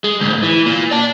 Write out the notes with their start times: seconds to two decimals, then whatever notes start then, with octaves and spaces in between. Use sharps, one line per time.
0.04 G#3
0.20 D2 G#2
0.43 E3
0.66 A#2
0.91 D5 A5